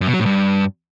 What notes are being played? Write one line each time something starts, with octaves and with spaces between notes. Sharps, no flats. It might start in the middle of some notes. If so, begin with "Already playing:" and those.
F#2
B2
F#3
A2
G2